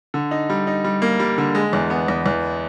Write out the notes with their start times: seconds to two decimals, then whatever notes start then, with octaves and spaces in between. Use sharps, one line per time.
0.14 D3
0.31 D#4
0.50 G3
0.67 D#4
0.84 G3
1.02 A#3
1.19 G3
1.38 D3
1.55 G#3
1.73 E2
1.90 B3
2.08 E2
2.26 E2